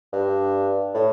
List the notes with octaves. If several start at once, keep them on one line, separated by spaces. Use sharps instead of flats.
G2
A2